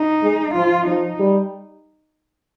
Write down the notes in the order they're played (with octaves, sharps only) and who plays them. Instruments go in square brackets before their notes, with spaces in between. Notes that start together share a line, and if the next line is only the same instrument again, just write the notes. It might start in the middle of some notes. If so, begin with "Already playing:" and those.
Already playing: [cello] D#4
[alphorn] G#3
[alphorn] F3 [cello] F4
[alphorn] F3 [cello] D#4
[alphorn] G3